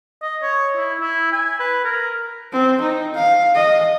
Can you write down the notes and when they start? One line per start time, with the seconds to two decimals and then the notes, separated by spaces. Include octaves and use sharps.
0.22 D#5
0.42 C#5
0.77 E4
1.00 E4
1.32 G#5
1.60 B4
1.84 A#4
2.53 C4
2.81 D#4
3.15 F5
3.55 D#5